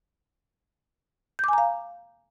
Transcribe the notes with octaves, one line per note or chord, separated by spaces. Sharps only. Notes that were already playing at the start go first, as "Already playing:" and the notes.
F5 G#5 A#5 D6 G6